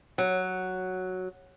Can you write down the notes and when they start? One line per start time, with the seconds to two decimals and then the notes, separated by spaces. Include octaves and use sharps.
0.18 F#3